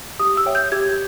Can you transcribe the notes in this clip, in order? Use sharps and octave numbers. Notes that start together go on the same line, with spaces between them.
G4 D#6
E6
C#5 E5 G5
G6
G4 G#6